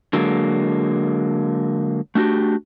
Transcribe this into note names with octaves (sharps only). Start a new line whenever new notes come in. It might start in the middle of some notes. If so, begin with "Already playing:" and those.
D3 F#3 G#3 A#3
A3 D4 E4 F#4 G4